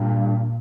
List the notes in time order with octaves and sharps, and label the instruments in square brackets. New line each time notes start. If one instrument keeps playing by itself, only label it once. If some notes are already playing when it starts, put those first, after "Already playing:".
Already playing: [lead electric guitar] G2 [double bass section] A#2